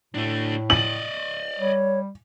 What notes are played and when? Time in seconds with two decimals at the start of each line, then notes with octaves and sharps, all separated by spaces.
0.14 A2 A3 D4
0.70 D5 D#5 F#7
1.59 G3 C#5